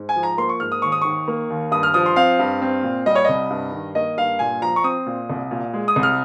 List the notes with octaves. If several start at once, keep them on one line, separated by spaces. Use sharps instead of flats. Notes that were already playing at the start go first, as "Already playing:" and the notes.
Already playing: G#2
G#5
F3
A#5
A#3 C6
C#6
G#2 F6
D#6
D#2 C#6
D#6
D#3 C#6
A#3
D#2
G2 D#6
F6
F3 D#6
C6
C4 F5
G2
C4
A#2
G3 D#5
C#5
C2 D#5
G2
D#3
A#3 D#5
G2 F5
A#2 G#5
F3 A#5
C#6
C4 D#6
A#2
C2
A#2
G#3
D#6
C2
F6